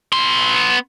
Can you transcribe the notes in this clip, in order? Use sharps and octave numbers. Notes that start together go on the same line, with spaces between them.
B3 C6